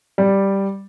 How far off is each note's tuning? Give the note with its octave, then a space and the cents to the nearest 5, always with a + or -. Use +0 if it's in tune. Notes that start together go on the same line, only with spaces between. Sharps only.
G3 +0 D5 +0